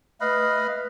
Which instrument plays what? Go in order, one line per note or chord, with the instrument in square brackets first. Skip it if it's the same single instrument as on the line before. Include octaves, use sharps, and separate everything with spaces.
[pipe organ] A3 B4 [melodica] D#5 F5 B5